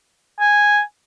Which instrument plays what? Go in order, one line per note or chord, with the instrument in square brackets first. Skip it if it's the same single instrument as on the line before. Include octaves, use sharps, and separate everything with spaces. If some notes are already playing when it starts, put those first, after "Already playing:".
[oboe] G#5